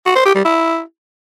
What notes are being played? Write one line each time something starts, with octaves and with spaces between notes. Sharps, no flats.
F#4
C5
G4
G3
E4